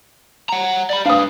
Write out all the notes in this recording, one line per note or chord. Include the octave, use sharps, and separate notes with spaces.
F#5 A#5
D5 B5
D4 B4 F5 D#6